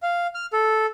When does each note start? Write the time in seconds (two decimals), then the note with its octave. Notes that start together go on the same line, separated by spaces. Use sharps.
0.02 F5
0.35 F6
0.53 A4